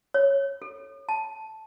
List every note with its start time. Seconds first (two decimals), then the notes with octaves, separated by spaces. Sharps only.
0.14 C#5
0.62 A4
1.09 A5